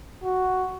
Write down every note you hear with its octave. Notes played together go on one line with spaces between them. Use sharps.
F#4